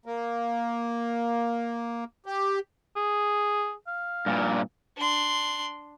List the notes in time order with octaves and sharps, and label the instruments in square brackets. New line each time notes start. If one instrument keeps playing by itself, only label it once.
[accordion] A#3
G4
[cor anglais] G#4
F5
[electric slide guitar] G2 A#2
[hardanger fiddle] D4 C6